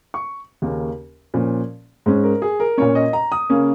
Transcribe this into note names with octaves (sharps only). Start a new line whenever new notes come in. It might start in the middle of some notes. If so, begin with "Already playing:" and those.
C#6
D#2 C#3 A#3 C#4
A#2 F3 C#4
G#2 G#3 C#4
A#4
G#4
A#4
A#2 A#3 C#4 C#5
D#5
A#5
D#6
C#3 A#3 C#4